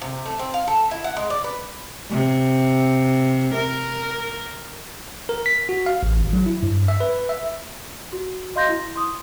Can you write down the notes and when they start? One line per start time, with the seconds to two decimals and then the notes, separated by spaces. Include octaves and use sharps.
0.02 C3
0.26 A3
0.39 C4
0.54 F5
0.68 A4
0.91 E4
1.04 F#5
1.17 G#3
1.30 D5
1.44 B4
2.11 C3
3.54 A#4
5.29 A#4
5.46 B6
5.69 F#4
5.86 F5
6.03 A1
6.19 G#1
6.33 F#3
6.46 E4
6.63 G2
6.88 E5
7.00 B4
7.29 E5
8.13 F#4
8.55 F#4 D#5 F5 C6 G6 A#6
8.69 E4
8.95 C6 D#6